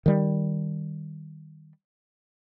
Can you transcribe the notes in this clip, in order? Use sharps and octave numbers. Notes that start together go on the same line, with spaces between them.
D#3 G3